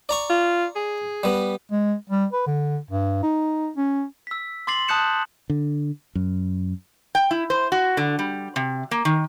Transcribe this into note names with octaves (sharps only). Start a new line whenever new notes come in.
D5 A#5 C#6
F4
G#4
G3 B3
G#3
G3
B4
D3
G2
D#4
C#4
E6 B6
C6 D6 A6 C7 F#7
A5 D#6 F#6 G6 C#7 E7
D3
F#2
G5
E4
C5
F#4
D3
G3
C3
A#3
D#3